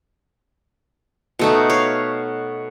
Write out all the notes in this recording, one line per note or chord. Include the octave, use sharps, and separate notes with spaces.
B2 A3 D#4
C#5 F5